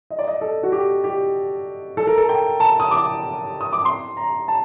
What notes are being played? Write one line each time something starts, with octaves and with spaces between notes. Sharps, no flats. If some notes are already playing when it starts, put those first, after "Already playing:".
D#5
D5
D#5
A4
F#4
G4
G4
A4
A#4
A4
G5
A5
D#6
D6
D#6
D6
C6
A#5
A5